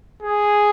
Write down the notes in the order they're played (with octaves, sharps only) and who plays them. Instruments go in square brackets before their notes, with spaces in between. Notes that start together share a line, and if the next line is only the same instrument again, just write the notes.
[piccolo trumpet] G#4